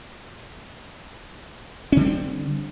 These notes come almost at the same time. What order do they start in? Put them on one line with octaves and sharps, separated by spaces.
C#4 D3 G3 C4